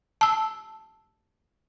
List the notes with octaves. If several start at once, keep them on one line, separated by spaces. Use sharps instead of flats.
A5 E6